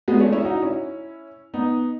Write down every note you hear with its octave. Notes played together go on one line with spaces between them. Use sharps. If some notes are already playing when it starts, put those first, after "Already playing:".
G#3 B3
A3 C#4
C#4 E4
D#4 F#4
C#4 E4
B3 D#4